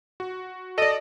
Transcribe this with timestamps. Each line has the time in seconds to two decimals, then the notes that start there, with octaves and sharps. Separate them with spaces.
0.20 F#4
0.78 A4 D5 D#5